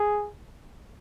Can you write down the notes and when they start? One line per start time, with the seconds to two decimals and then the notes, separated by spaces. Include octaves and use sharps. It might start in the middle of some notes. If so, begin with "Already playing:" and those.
Already playing: G#4